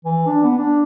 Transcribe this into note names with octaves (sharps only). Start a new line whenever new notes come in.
E3
D4
B3
D4